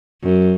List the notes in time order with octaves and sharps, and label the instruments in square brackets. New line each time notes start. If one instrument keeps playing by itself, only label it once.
[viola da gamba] F#2